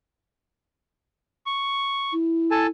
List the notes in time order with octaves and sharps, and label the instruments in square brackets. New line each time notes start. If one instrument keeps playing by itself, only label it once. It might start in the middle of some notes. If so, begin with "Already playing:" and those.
[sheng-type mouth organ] C#6
[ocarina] E4
[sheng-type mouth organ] A4 G#5 A5